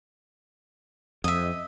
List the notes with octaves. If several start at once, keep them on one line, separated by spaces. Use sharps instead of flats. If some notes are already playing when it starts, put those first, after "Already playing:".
F2 D#5 E5